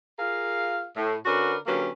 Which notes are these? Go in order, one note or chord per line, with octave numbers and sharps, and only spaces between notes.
F4 G#4 A#4 F5
A2
D3 C#4 F#4 A#4 B4 D5
D3 F#3 A#3 C#4 G4 B4